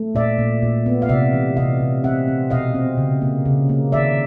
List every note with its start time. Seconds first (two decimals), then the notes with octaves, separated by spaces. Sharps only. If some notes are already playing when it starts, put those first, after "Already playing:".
Already playing: A3
0.15 A#2 D5 E5
0.38 A#2
0.62 A#2
0.86 B3
1.02 F5
1.09 C3 D5 E5
1.33 E3
1.57 C3 D#5 F5
1.80 C3
2.04 C4 E5 F#5
2.28 C4
2.50 B2 D#5 F5
2.75 C4
2.98 C#3
3.22 A#3
3.45 C#3
3.69 A#3
3.92 D#3 D5 E5